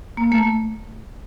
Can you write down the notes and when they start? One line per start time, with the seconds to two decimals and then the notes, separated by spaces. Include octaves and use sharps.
0.17 A#3
0.32 A3